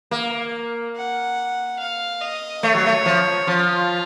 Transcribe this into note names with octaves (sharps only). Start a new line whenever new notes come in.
A#3
F#5
F5
D#5
A3 C#5
F#3
A3
F3
F3 F4